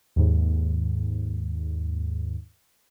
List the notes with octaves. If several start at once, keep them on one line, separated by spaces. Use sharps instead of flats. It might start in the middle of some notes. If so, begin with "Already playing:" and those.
D#2 G#2